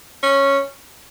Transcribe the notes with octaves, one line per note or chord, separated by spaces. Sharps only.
C#4